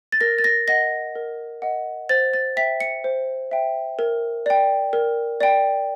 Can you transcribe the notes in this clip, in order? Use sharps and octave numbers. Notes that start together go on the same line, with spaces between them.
A6
A#4 A#6
A6
A#6
D#5 F#5 A#6
A#4
D#5 F#5
C5 A6
A6
E5 G5 B6
C#7
C5
E5 G5
A#4
D5 G5
A#4
D5 G5